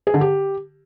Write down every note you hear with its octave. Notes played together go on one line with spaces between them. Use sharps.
G#4
D3
G4